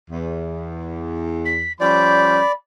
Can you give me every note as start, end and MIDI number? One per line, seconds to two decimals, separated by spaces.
0.11 1.71 40
1.45 1.72 95
1.81 2.40 53
1.81 2.40 55
1.81 2.40 61
1.81 2.52 74
1.81 2.54 83
1.81 2.39 91